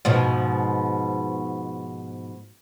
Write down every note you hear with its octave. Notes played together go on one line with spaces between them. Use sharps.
G#2 B2 F3